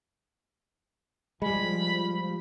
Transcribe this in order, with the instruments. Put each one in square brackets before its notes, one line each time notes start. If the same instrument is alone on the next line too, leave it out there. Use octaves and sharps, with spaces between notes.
[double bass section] F3 [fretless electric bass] G3 G#3 [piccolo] B5